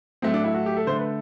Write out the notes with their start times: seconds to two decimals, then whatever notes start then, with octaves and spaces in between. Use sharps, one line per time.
0.22 A2 F#3 A3 C4
0.34 D4
0.44 E4
0.54 F#4
0.66 G4
0.77 A4
0.87 D3 A3 C5
0.98 B4